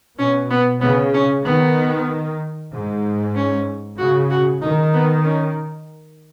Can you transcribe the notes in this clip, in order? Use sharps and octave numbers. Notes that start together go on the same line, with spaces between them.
B2 C#4
B3
C#3 B3
C#4
D#3 B3
G#2
C#4
C#3 F#4
F#4
D#3 D#4
B3
C#4